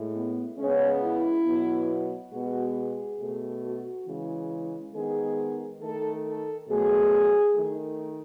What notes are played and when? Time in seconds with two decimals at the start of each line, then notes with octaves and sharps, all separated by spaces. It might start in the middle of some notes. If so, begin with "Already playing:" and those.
Already playing: A2 G#3
0.14 B3
0.58 C#3 G#3 B3 C#4
1.02 E4
1.45 B2 F#3 B3
2.33 B2 G#3 B3 F#4
2.77 G#4
3.20 B2 A3
3.63 F#4
4.07 C#3 E3 G#3
4.94 D#3 G#3 B3 G#4
5.81 D#3 A3 A4
6.25 A4
6.69 B2 F#3 A3 G#4
7.55 D#3 A3